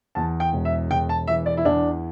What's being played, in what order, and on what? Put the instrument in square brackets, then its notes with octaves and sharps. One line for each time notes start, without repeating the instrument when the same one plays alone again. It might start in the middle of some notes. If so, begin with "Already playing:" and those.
[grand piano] E2 A5
G5
E1
E5
E1 G5
A5
E3 E5
D5
E4
E2 D4